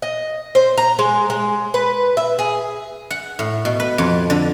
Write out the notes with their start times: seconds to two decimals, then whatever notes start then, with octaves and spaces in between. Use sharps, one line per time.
0.02 D#5
0.55 C5
0.77 A#5
0.99 G#3
1.30 G#3
1.74 B4
2.17 E5
2.39 G#4
3.10 F#5
3.39 A2
3.65 B2
3.80 B4
3.98 F2
4.30 D3